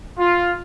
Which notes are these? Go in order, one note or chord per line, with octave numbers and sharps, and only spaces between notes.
F4